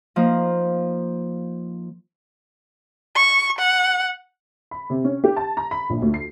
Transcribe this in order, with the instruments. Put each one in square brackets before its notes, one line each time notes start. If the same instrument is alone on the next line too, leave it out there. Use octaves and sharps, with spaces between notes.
[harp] F3 A#3 D#4
[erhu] C#6
F#5
[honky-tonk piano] B5
C3
C#4
G4
A5
A#5
B5
A#1
D2
C7